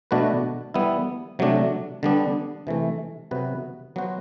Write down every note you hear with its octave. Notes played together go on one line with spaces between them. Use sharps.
B2 A3 D4 F#4 B4
G3 B3 E4
C3 F#3 A3 D4
D3 G3 B3 D4
C3 E3 A3
C3 F#3 B3 F#4 B4
F#3 B3 F#4 C5